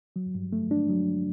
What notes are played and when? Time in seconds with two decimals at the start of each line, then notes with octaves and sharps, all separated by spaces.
0.16 F#3
0.35 G2
0.53 A3
0.71 D4
0.89 F#3